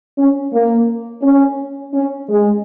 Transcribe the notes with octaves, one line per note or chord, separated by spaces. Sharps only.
C#4
A#3
C#4
C#4
G#3